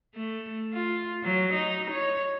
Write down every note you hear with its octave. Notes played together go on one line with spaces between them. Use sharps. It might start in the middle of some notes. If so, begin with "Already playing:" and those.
A3
F4
F#3
D#4
C#5